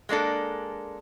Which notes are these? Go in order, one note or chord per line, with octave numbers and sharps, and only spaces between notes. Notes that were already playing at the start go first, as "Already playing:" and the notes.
G#3 A#3 D4 A4